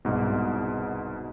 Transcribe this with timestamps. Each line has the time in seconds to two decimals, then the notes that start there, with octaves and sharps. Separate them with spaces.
0.05 C2 G#2 B2